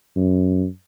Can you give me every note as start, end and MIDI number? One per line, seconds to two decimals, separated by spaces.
0.16 0.66 42